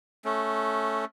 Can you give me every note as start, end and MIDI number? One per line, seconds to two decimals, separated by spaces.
0.25 1.05 57
0.25 1.05 61